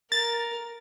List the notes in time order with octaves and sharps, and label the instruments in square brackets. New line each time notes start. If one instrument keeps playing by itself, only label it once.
[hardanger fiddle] A#4 [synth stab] A6